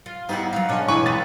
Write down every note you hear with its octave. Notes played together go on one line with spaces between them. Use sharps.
F4
G3 B3 D#4 E4 F#4 A#4 C5 C6
F#3 C4 F5
B2 G#3 C#4 D4
E2 A2 D3 G#4 B4 D#5 G#5 C#6
A2 C4 F4 B4 A6